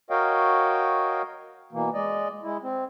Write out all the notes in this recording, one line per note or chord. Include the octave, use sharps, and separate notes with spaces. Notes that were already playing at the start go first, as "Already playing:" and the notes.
F#4 A#4 C#5 D#5 F5 G5
B2 E3 A#3
G#3 D5 D#5
G#3 E4
C4